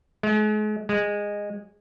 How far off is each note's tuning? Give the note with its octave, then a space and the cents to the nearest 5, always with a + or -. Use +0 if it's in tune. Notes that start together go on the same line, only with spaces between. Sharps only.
G#3 +40
G#3 -15